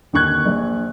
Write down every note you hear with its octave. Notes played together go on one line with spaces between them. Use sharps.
D#2 D3 C#6 F#6 G#6
A#1